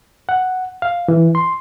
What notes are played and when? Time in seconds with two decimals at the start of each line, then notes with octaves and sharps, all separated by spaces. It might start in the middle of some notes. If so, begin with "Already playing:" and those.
0.29 F#5
0.82 F5
1.08 E3
1.35 C6